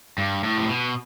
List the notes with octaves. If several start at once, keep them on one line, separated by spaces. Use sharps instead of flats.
G2
A2
C3
B2